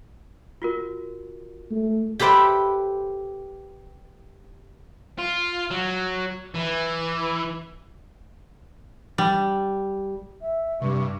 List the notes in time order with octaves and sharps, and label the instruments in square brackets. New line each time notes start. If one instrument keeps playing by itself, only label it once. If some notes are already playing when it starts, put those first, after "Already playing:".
[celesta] F4 F#4 A#4
[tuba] A3
[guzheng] G4 A4 B4 C5 E5 G5
[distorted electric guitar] F4
F#3
E3
[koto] G3
[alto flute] E5
[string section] G2 [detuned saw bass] C3 [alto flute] C#6